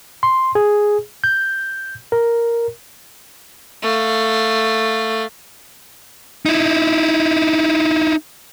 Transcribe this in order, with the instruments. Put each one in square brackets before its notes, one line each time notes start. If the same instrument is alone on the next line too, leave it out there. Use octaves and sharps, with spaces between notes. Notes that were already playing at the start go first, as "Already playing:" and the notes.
[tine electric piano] C6
G#4
G6
A#4
[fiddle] A3 F5
[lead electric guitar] D#4 E4